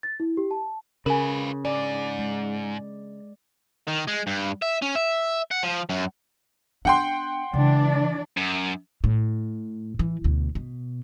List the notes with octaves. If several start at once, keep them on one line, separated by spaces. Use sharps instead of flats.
A6
E4
G4
A5
C#3 F4 A#4 B4 G#5
G#2 D5
G#3
D#3
G#3
G2
E5
C#4
E5
F#5
F3
F#2
B3 D4 F#5 G5 C6
C#3 E3 G#3 D4 D5
F#2
A2
E3
D2 B2
B2